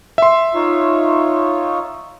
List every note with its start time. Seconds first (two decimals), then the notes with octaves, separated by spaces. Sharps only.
0.18 E5 C6
0.55 D#4 F4 C#5